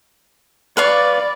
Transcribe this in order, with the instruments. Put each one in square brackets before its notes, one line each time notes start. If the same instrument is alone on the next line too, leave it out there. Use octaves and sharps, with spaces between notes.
[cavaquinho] B4 F5 C#6 [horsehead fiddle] D5